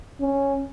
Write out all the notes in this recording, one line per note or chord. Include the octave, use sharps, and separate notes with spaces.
C#4